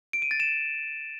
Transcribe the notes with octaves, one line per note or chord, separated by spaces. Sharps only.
D7
D#7
A6
E7